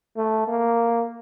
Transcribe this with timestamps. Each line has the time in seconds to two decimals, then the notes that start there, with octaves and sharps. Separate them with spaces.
0.17 A3
0.47 A#3